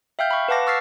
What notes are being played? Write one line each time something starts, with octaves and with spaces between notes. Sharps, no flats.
E5 F5 G5 F6 G6
B5 C#6
B4 F5 F#5 A5 D6 A#6
C#6 E6 F6 A6 B6 C7